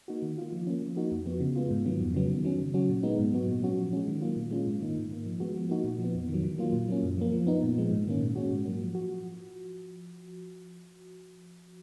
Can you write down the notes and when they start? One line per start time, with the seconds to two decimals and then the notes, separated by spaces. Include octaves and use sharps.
0.08 A#3 D#4 F#4
0.22 D#3
0.38 A#3 F4
0.53 F3
0.67 A#3 C#4
0.82 F3
0.96 A#3 D#4 F#4
1.12 F2
1.26 F3 B3 F#4
1.40 C#3
1.56 G#3 B3 F4
1.71 G#2
1.86 D#3 F#3 B3
2.01 F2
2.14 C#3 F#3 B3
2.30 D#3
2.45 F#3 C#4
2.60 C#3
2.74 F#3 C#4 F#4
2.89 A#2
3.03 G#3 B3 D#4
3.19 G#2
3.33 F#3 B3 F#4
3.48 A#2
3.62 F#3 C#4 F#4
3.78 F3
3.93 G#3 C#4
4.07 D#3
4.22 F#3 A#3 F4
4.36 A#2
4.51 G#3 C#4 F4
4.67 G#2
4.81 D#3 A#3 D#4
4.96 G#2
5.11 D#3 A#3
5.26 F3
5.40 G#3 B3 F#4
5.55 F3
5.69 A#3 D#4 F#4
5.84 A#2
5.99 F3
6.04 B3
6.15 F2
6.28 D#3
6.34 F#3
6.44 D#3
6.58 F#3 A#3 F4
6.73 A#2
6.88 F#3 A#3 C#4
7.03 F#2
7.18 F3 A#3
7.32 F3
7.47 B3 D#4
7.62 A#2
7.77 F3 G#3
7.91 G#2
8.07 D#3 A#3 C#4
8.21 A#2
8.35 G#3 C#4 F#4
8.50 G#2
8.66 F#3 A#3
8.80 F3
8.95 F#4